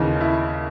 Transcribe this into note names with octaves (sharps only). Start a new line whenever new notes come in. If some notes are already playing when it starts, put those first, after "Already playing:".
Already playing: D#2 C#3 E3 D#4
E4